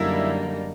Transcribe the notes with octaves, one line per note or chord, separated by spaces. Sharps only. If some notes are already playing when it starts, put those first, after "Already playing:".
Already playing: F#2 D3 G3 A#3 D#4 E4